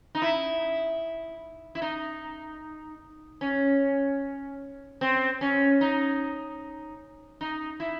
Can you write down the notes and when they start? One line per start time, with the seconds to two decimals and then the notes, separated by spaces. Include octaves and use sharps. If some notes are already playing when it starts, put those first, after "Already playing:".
0.15 D#4
0.22 E4
1.75 E4
1.82 D#4
3.41 C#4
5.01 C4
5.41 C#4
5.81 D#4
7.41 D#4
7.80 E4